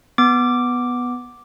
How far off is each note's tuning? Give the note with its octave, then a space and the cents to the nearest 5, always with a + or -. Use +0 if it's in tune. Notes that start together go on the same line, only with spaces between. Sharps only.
B3 +0 D6 +0